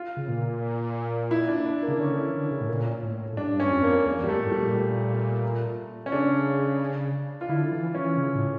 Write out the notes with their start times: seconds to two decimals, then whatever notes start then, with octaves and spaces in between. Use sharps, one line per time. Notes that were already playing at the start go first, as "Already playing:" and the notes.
Already playing: F4
0.17 C#3
0.28 A#2
1.31 E4
1.49 D4
1.66 D4
1.83 A#3
1.88 C#3
2.00 D3 C#4
2.16 E3
2.35 D3
2.51 C#3
2.61 A2
2.69 A#2
3.03 A2
3.33 A2
3.36 G2 D4
3.60 G2 C#4
3.71 F2
3.83 A#3
4.06 E2 A#3
4.23 G2 G3
4.29 A3
4.39 A2
4.52 G3
4.58 A#2
4.74 A3
6.06 C#4
6.12 C#3 D4
7.41 F4
7.49 D3 E4
7.71 E3
7.95 E3 C#4
8.17 C#3
8.35 A2